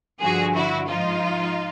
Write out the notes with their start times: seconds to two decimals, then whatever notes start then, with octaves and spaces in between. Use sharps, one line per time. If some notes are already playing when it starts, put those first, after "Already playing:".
0.21 G2 D3 F3 F#4 G#4
0.55 E4 F#4
0.87 G#2 F3 D#4 F4